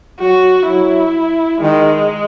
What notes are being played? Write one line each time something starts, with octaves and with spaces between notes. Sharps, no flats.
F#3 F#4
F#3 E4
D#3 G#3